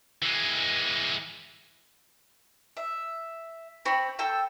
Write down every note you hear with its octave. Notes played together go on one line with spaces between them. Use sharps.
E3 G#3
E5
C4 B5 C#6
A4 G5 E6